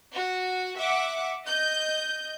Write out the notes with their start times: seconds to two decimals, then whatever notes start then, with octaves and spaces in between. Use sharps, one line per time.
0.14 F#4
0.78 E5 F#5 D6
1.45 D#5 G6